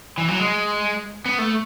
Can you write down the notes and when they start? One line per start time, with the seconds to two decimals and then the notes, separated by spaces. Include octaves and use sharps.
0.18 E3
0.28 F#3
0.40 G#3
1.26 B3
1.39 A3